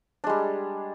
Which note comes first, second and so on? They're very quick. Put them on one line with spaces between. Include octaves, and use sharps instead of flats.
D4 G#3 G3